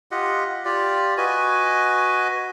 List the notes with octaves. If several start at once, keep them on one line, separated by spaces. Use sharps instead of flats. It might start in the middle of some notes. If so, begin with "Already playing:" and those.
F4 G4 D#5 F#5
F4 G4 D5
F#4 B4 D#5 G#5